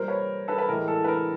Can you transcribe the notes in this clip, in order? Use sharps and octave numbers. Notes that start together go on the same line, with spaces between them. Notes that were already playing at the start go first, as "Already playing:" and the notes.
Already playing: A#2 G3 A#4 C5
B4 C#5
A4 B4
B4
A2 E3 G#3 A#4
A4
B4
A#4